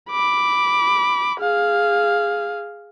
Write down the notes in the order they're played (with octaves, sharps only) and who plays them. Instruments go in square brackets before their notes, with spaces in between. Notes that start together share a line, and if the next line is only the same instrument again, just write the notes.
[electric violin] B5 D6
G#4 F5